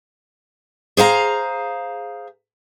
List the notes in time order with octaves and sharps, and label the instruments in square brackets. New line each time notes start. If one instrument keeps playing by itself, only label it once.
[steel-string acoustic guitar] G#4 C5 F5 A#5